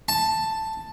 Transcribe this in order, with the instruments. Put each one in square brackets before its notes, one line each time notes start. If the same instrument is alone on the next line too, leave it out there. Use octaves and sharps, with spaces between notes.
[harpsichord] A5